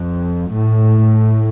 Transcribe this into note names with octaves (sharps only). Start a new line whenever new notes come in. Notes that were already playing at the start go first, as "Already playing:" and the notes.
Already playing: F2
A2